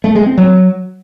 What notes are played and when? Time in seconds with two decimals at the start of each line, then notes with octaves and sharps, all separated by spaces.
0.04 A3
0.15 G#3
0.26 C4
0.38 F#3